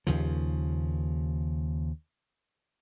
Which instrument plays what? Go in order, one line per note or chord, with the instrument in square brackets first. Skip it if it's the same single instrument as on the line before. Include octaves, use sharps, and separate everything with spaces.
[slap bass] D#2 C#3 F3